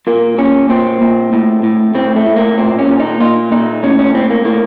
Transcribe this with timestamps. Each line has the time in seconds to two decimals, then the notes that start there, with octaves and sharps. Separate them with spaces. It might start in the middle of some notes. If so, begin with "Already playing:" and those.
0.07 A#2 A#3
0.38 A#2 C#4
0.70 A#2 C4
1.01 A#2
1.33 A2
1.63 A2
1.95 A2 C4
2.16 A3
2.26 A2
2.36 A#3
2.57 A#2 C4
2.79 C#4
2.89 A#2
3.00 D#4
3.20 A#2 F4
3.51 A#2 D#4
3.83 A2 C#4
3.99 C#4
4.14 A2 C4
4.30 A#3
4.45 A2 A#3